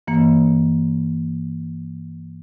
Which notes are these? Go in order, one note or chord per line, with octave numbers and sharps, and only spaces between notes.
G2 E3 A#3